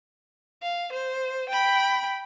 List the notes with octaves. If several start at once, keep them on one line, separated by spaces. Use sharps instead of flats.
F5
C5
G5 B5